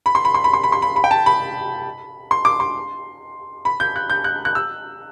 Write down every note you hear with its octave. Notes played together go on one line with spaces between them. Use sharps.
B5
C6
B5
C6
B5
C6
B5
C6
B5
B5
G5
A5
B5
C6
D6
C6
B5
G6
F#6
G6
F#6
F#6
E6